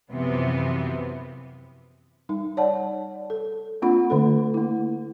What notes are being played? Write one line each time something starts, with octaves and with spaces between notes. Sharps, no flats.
F#2 C3 E3 F3 B3
G3 D#4
C#5 D5 F#5 A5
A4
A#3 C4 D4 F4 F#5 B5
D3 A3 A4
A#3 E4